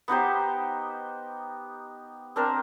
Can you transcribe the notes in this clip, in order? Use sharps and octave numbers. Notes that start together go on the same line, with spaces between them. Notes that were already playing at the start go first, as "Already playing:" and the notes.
B3 D#4 G4 C5
C4 D4 A#4 C5